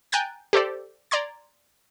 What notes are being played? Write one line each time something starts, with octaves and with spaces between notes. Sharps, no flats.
G5 G#5 A#5 F#6 G6 A6
G4 A4 C5 D5
D5 A#5 C6 G#6